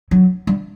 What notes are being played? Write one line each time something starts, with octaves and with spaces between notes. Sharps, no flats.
F#3
G3